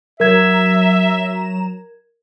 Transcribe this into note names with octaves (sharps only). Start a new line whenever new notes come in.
F#3 A#4 E5 A#5 G#6 E7